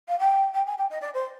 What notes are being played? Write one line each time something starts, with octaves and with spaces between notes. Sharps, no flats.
F5
G5
G5
G#5
G5
D#5
D5
C5